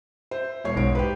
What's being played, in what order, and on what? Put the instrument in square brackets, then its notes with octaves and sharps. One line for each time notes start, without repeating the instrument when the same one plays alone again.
[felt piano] C5 E5
E1 C#5 C7
[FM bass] B1 [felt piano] G#2 D7
[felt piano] G4 B4